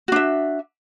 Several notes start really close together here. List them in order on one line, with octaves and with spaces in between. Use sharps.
F#4 D4 E5